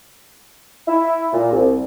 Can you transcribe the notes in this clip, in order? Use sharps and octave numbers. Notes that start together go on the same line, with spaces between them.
E4
A#2
C2